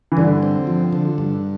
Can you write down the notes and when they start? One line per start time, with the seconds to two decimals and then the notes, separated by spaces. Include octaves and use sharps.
0.12 E3
0.17 G2 D3
0.43 C4
0.67 F3
0.93 D3
1.18 G2